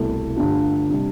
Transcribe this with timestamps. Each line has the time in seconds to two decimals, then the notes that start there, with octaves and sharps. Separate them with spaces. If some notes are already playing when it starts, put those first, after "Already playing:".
Already playing: C2 B2 A3 E4
0.36 G2 D3 A3 D4 F4
0.89 C3 G3 D4